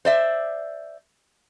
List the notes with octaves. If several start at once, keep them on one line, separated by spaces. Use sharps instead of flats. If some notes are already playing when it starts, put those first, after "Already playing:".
C5 D5 E5